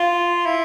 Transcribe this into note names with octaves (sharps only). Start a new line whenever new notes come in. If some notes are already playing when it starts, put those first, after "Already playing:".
Already playing: F4
E4